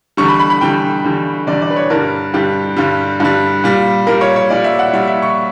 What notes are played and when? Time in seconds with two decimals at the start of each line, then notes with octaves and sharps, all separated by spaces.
0.17 E2 D3 G3 C#6
0.28 B5
0.39 B5
0.50 B5
0.61 E2 D3 G3 G5
1.04 E2 D3 G3
1.47 E2 D3 G3 D5
1.62 D5
1.70 B4
1.76 C#5
1.90 G2 D3 G3 A#4
2.34 G2 D3 G3 G4
2.76 G2 D3 G3
3.20 G2 D3 G3
3.64 A#2 G3
4.07 A#2 G3 A#4
4.21 C#5
4.36 C#5
4.50 A#2 G3 D5
4.64 E5
4.79 F#5
4.93 A#2 G3 E5
5.08 E5
5.22 C#6